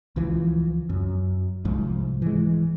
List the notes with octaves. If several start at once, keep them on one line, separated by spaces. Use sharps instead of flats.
C#2 E3 F3
F#2
C2 G#2 F3
E3 G#3